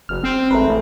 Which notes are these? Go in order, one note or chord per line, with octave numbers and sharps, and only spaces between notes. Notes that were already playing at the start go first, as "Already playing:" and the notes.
F#1 F6
C4
G#1 A3 A#4 B4
A1